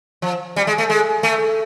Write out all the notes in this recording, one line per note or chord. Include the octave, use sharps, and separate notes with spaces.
F3
G3
G#3
A3
G#3
A3